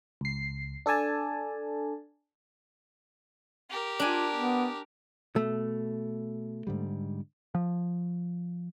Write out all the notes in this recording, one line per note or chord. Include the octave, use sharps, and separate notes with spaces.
C#2 C7
D4 A4 D5 G#5 A5
G4 A#4
D4 F4 G#5
B3
B2 A3
G#2 D3 G3
F3